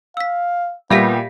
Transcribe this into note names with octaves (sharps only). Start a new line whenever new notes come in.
F5 E6 B6
A#2 G3 B3 G4 E5 F5 A#6 B6